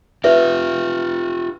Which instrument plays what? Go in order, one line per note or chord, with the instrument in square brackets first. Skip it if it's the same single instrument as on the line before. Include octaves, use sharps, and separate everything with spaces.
[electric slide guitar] F4 G4 [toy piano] B4 E5